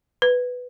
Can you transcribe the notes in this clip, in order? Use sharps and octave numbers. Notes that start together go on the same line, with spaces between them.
B4